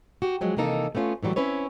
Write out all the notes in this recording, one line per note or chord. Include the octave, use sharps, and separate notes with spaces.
F#4 G4
F3 F#3 G#3
C3 D#3 E3 A#3 D#4 A4
A3 B3 C#4 F4
A2 E3 F#3 G3
C4 C#4 E4 B4 C#5